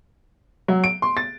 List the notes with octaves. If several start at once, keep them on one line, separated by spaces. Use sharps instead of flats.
F#3
D7
C6
A6